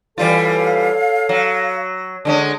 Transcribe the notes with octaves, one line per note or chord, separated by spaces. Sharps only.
E3 G3 F4 A4 C#5 F5
F#3
D3 G#3 C#4